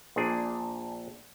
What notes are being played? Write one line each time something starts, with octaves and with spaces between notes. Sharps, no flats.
A#1 A#2 D4 G#4